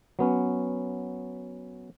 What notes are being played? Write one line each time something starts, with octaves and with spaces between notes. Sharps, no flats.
F#3 B3 C#4